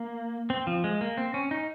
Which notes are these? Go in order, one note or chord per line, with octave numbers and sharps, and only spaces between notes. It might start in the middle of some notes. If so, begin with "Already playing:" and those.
Already playing: A#3
C4
F3
G#3
A#3
C4
C#4
D#4